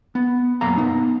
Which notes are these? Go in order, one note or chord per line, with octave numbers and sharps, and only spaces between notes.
B3
F#2 B2 A#3 F5 A#5
B3 D#4